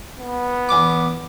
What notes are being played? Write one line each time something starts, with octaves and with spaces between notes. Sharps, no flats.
B3
E2 D6